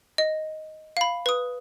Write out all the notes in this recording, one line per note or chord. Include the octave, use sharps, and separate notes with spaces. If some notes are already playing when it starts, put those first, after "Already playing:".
D#5
F5 B5
B4 D#6